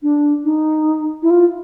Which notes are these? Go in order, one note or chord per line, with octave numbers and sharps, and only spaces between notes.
D4
D#4
E4
F4